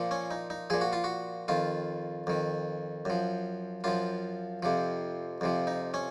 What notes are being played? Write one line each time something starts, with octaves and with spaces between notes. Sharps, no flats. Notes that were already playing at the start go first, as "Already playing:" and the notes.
Already playing: A#2 F3
C#4
D#4
D#4
A#2 F3 G#4
F#4
F4
F#4
F2 D#3 F4
F2 D#3
F#2 F3
F#2 F3 F4
F2 C3 F3
F2 C3 F3
D#4
C#4